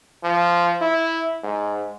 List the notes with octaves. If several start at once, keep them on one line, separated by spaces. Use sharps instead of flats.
F3
E4
G#2